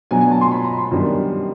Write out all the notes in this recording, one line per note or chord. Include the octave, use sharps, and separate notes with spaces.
B2 F#3 B3 D4 G#5
G#5
A5
C6
B5
A#5
C6
F#2 D#3 G3 B3 D4